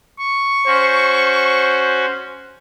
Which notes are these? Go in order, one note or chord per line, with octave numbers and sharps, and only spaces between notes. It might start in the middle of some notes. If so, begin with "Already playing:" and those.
C#6
C#4 F#4 C5